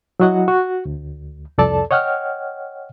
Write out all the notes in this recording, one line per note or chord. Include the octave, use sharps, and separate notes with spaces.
F#3 E4 F#4 D#5 F#5
F#4
D2
C2 F2 A4 D5 A5
C#5 D#5 F#5 G5 F6